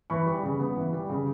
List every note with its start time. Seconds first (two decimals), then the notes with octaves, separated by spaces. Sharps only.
0.10 E3 B5 C#6
0.26 G3
0.43 C#3
0.60 B3
0.77 E3
0.93 G3
1.10 C#3